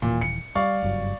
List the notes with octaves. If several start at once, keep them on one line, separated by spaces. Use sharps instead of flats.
D#1 A#2 E3
C#7
G3 D5 F5 C#6
F#1 G2 F#3